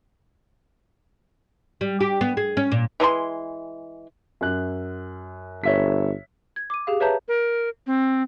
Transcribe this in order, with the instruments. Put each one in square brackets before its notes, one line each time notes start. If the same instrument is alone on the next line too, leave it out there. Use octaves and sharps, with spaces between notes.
[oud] G3
G4
B3
G#4
C#4
A#2
[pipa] E3 G#3 A5 C6
[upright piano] F#2 F#6
[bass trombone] G1 [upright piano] C#5 E5 B6
[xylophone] G#6
D6 D#7
G4 G#4 F5
B4 C#5 E5 A5 A#5 G6
[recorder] A#4
C4